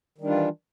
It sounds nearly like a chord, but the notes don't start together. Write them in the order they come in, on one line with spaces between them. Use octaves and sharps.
D#3 G3 D4 F4 E3